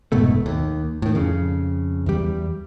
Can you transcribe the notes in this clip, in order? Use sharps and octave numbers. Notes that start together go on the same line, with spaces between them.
F1 G#2 B2 A3
D#2
A2 D#3
F2 C#3
E2 G3